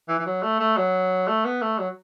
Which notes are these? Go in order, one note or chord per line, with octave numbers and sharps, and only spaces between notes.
E3
E3
F#3
A3
A3
F#3
A3
B3
A3
F#3